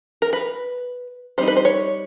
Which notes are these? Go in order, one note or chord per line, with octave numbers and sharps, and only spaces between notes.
A#4
B4
G3 C4 D#4 C5
B4
C5
C#5